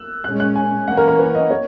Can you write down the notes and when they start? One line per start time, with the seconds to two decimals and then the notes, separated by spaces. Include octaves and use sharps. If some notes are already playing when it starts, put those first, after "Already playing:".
Already playing: E6 F#6
0.23 A#2 G#3 C#4 F#6
0.40 F#6
0.56 G#5
0.87 E3 A#3 C#4 F#5
0.97 A#4
1.08 A#4
1.19 B4
1.35 D#5
1.51 C#5